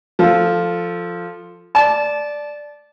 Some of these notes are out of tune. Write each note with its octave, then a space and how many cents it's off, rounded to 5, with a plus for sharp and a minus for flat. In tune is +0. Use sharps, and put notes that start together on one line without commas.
F3 +0 A4 +5
D5 +0 A5 -20